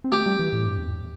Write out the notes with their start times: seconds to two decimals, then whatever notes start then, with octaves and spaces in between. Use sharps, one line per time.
0.04 C4
0.12 A3 G4
0.26 G3
0.39 E3
0.53 A2
0.66 G2
0.78 E2